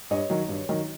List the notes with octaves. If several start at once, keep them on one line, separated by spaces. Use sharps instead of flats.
G2 C#5 D#5
D#3 F#3
G2
D#3 F#3